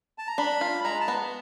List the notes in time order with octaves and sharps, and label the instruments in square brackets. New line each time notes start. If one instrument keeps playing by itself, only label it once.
[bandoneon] A5
A#5
[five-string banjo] D4 [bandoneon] B5
[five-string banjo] F4
[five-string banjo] G#3 [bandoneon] A#5
[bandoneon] A5
[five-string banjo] B3